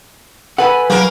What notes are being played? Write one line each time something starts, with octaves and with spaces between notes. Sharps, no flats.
A4 B4 F#5 G#5 B5
F#3 A#3 A#4